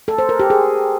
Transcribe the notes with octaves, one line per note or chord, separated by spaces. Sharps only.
A4
C5
A#4
G4
G#4